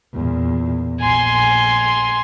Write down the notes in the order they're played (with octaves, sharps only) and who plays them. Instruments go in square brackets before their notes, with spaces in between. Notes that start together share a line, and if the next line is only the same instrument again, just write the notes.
[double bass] E2 A#2
[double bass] A#1 [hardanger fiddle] G#5 C6